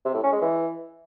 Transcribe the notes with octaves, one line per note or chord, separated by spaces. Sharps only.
C3
A2
C#4
G#3
E3